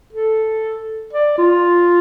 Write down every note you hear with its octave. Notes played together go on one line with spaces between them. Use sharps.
A4
D5
F4